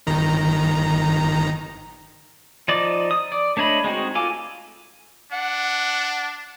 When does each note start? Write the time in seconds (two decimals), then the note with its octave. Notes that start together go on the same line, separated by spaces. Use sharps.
0.07 G1 D#3 A#5
2.68 F3 D#4 D5 D6
3.11 D#6
3.32 D5
3.57 A3 D4 C#5 D#5 B5
3.84 G#3 C4 D#4 F#4
4.15 F4 A4 G#5 D6
5.32 D4 F#5